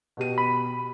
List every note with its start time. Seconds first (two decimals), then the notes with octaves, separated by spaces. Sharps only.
0.17 B2 G4 D#7
0.38 B5